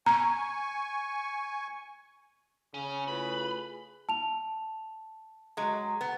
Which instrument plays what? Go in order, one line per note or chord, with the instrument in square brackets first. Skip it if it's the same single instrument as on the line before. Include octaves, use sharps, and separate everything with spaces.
[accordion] G#5 C#6 [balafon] A#5
[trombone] C#3 [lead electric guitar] C#4
[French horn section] A3 E4 F4 [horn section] G#4 B4 [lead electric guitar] B5
[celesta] A5 F7
[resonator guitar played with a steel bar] F#3 G#3
B3